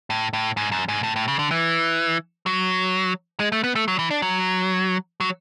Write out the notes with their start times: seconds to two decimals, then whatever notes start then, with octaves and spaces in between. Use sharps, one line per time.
0.10 A2
0.33 A2
0.57 G#2
0.72 F#2
0.88 G#2
1.03 A2
1.16 A2
1.28 C#3
1.39 D3
1.51 E3
2.46 F#3
3.40 G#3
3.52 A3
3.64 B3
3.75 A3
3.88 F#3
3.99 E3
4.11 D4
4.22 F#3
5.20 F#3